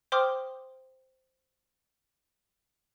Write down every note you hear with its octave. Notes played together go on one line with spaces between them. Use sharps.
C5 G5 C6 D6 D#6 F6